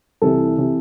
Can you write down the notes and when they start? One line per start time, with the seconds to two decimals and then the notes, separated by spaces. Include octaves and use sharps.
0.22 C2 C3 E3 A4
0.58 C3 E3